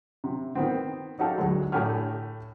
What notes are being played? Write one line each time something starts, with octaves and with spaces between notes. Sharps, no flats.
C3
D#3 B3 C4
C#4 D#4 F#4 G4 A4 F5
D2 F#3 G#3
A2 D3 G4 C#5 G#5 F6